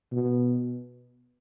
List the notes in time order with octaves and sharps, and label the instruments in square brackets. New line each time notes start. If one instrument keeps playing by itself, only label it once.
[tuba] B2